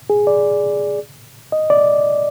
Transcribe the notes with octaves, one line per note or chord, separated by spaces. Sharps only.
G#4
D5
D#5
D5